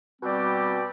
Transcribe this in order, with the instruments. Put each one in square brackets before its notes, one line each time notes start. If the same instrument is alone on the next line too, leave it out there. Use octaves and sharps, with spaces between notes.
[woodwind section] B2 G3 C4 G4 D5